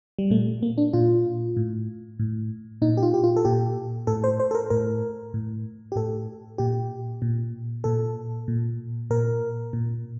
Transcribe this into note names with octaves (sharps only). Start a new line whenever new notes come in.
G3
A#2 A3
A#3
D4
A#2 F4
A2
A2
A#2 D#4
G4
F4
G4
F4
A4
A#2 G4
A2 A4
C5
C5
A4
A#4
A2 A#4
A2
G4
A2 A4
A#2 G4
A#2
A#2 A4
A#2
A#2 A#4
A#2